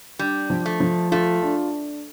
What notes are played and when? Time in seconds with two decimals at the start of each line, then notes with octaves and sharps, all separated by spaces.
0.19 G3 D4
0.50 F3
0.66 A3
0.80 F3
1.12 A3 F4
1.42 D4